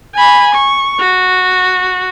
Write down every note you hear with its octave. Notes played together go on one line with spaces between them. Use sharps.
G#5 B5
C#6
F#4